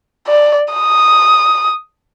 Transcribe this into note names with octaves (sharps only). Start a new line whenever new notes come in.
D5
D#6